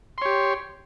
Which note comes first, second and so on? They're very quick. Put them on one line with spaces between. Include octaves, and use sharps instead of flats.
C6 C#5 G4